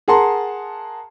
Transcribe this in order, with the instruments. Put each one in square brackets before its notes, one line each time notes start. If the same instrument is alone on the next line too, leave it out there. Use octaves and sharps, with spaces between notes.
[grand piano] G#4 A#4 F#5 A5 A#5 C6